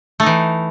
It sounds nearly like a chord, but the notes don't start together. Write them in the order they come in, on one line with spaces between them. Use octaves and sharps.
A3 D#4 E3